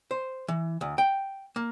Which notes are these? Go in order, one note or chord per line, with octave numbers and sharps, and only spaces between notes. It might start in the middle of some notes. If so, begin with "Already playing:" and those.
C5
E3
D2
G5
A#3